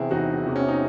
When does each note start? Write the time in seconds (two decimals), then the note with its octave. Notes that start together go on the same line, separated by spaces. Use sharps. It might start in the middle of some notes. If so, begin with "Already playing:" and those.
Already playing: E1 E2 C3 E4 G#4
0.11 E1 D#4 F#4
0.46 E2 C3
0.56 C#4
0.69 D#4